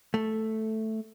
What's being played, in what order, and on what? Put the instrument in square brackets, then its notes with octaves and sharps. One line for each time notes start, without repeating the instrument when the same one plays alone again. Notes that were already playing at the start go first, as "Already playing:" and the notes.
[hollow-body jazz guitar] A3